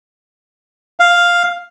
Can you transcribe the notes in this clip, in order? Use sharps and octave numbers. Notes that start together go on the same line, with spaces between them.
F5